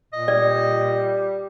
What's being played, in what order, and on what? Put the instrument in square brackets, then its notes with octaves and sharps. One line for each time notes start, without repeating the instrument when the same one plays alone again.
[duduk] A#2 [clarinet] D#5
[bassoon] G3 [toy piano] D5